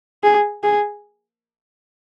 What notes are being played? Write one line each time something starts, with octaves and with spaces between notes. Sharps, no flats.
G#4
G#4